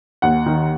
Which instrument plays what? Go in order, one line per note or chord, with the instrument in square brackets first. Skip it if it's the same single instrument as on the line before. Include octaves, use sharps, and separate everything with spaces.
[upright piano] D#2 F#5
D#3